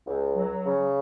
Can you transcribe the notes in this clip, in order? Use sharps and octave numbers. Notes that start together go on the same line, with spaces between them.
C#2
F#3
C#3